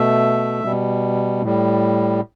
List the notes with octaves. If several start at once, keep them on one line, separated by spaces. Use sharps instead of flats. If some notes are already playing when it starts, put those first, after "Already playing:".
Already playing: B2 A3 E5
B2 G3
A2 G3